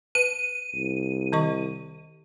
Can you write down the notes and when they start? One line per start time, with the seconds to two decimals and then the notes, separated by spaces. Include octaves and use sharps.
0.15 B4 D#7
0.75 C2
1.33 D#3 D#5 C#6